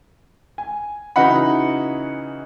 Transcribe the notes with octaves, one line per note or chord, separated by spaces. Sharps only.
G#5
C#3 E3 D#4 F#4 F#5 B5